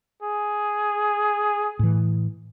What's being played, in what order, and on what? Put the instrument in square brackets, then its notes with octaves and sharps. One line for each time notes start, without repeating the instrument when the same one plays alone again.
[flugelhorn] G#4
[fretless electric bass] A2 E3